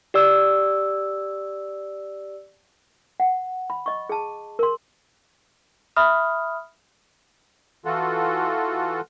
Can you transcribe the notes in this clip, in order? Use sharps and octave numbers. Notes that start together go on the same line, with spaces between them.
G4 D5 E6
F#5
B5
D#5 C#6
G#4 A5
A#4 C6
E5 B5 D#6 F6
E3 F4 F#4 A4